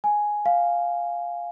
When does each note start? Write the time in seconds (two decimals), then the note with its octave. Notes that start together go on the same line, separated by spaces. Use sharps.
0.04 G#5
0.46 F5